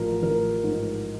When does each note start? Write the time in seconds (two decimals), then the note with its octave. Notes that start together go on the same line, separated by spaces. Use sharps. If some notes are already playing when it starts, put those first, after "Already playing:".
Already playing: A1 F3 A#4
0.23 A1 A#4
0.64 G#2